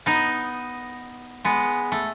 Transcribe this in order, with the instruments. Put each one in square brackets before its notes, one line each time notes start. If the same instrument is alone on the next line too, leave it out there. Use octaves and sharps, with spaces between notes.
[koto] B3 D#4
G#3 B3
A3